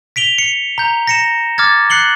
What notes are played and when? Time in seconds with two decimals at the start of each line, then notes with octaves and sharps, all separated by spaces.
0.16 B6 D7 F7 G7
0.38 C#7
0.78 A#5 G6
1.07 A#6 C#7 E7
1.58 D6 F6 G#6 A6
1.90 F#6 C7 C#7 F#7 G7